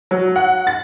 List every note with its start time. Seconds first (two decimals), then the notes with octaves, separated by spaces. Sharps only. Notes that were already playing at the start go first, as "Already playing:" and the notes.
0.11 F#3
0.36 F#5
0.67 A6